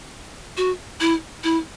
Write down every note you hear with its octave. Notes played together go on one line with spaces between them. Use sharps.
F#4
E4
E4